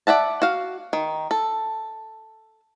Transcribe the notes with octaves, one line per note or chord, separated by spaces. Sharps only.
D5 E5 F#5 A5
F#4 F5
D#3
A4